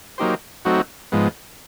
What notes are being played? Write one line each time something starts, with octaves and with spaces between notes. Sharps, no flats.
F#3 A#3 D#4 G4 C5
F#3 A3 C4 D#4 F#4
G#2 F3 G#3 B3